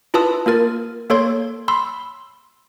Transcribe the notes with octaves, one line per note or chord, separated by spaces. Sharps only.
E4 F4 B4 A5 D#6 E6
A#3 F4 A#4 A6
A#3 A4 C#5 C6 G#6
B5 C6 E6